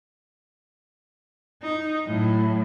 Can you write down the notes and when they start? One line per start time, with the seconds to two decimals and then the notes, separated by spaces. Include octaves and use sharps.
1.62 D#4
2.06 A2 F#3